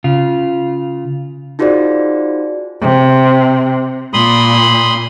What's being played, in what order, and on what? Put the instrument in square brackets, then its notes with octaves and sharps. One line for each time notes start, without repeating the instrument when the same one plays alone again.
[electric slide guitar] C#3 F4
[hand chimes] D#4 F4 F#4 G#4 C5 D5
[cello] C3
[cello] A#2 [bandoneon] B5 C6 D#6